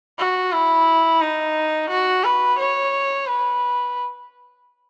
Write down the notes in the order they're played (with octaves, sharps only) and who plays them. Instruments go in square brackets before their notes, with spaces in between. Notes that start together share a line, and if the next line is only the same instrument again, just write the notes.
[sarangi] F#4
E4
D#4
F#4
B4
C#5
B4